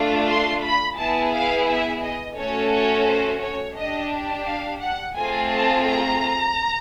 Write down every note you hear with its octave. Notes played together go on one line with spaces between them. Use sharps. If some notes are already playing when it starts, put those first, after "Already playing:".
Already playing: A3 D4 F4
C6
B5
B3 E4 G#4 A5
F5
E5
D#5
A3 C#4 F#4 A4 C#5
C#5
C5
C#5
D4 G4 D#5
F5
F#5
A3 C4 F4 G#4 G#5
A5
A#5